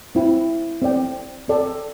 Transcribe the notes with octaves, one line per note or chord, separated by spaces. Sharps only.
C4 E4 C5 G5
C4 A4 D5 G5
C4 A4 D5 G5